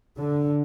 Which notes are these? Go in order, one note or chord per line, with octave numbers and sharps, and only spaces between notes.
D3